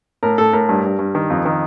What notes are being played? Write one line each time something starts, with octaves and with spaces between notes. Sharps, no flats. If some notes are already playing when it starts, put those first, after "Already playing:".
A2 A#4
A2 A4
A2 A#4
G2
G2
G2
D#3
F2
D#3